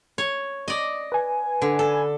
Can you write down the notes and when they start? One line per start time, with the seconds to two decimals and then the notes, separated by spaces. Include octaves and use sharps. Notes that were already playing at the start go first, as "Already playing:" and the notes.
0.18 C#5
0.68 D5 D#5
1.12 B4 G#5
1.62 D3
1.79 A4